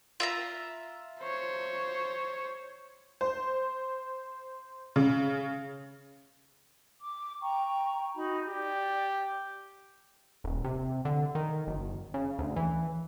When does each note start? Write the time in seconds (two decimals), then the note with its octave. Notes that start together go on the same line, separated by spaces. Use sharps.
0.20 F4 E5 A#5
1.20 C5 C#5
3.21 C5
4.96 C#3
7.01 D6
7.41 G5 A#5 C#6
8.14 D#4 F#4 B5
8.48 G4 D5
10.44 D#1
10.64 C3
11.05 D3
11.35 D#3
11.67 F#1
12.14 C#3
12.39 D2
12.56 E3